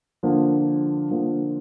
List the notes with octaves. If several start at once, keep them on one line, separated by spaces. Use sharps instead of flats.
D3 F3 A#3
D3 F3 A#3